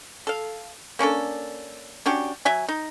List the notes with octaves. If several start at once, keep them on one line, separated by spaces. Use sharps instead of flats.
A4 F5
A#3 C#4 D4 A4
C#4 D4 F#4 G4
F#3 E5 G#5
D#4